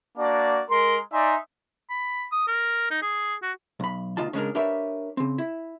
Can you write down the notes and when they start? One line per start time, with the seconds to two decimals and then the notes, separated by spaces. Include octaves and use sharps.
0.18 A#3 D4 F#4 D5
0.70 G#3 A#4 C6
1.13 D#4 D5 E5 G#5 C6
1.90 B5
2.32 D#6
2.48 A#4
2.91 D#4
3.02 G#4
3.43 F#4
3.80 B1 B5
4.17 D2 B2 D#4 F4 A5
4.33 C#3 G#3 D4 A#4
4.55 D4 G4 A#4 B4 C#5 E5
5.17 C#3 C4
5.38 E4